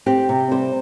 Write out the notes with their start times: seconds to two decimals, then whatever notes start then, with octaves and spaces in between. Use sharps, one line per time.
0.06 C4 G4
0.29 C3
0.51 G3 C5